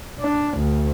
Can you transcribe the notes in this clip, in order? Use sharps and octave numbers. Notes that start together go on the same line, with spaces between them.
D4
D2